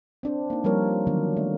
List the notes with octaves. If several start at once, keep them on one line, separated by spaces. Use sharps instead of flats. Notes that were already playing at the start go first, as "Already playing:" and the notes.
C4 D4 C5
A#3 D#4
F3 G3 A#3 F4 A#4 C#5
D3 D#3 F#3 B3 D4 A#4
A3 D4